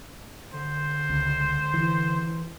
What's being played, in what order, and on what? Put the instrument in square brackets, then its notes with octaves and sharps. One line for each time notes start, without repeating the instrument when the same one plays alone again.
[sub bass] D3 [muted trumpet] C5
[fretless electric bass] C#2
E3